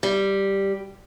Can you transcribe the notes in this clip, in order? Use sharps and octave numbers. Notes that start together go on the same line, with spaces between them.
G3